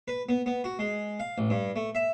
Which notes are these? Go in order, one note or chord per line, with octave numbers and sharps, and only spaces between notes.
B4
B3
B3
F#4
G#3
F5
A1
G2
A3
E5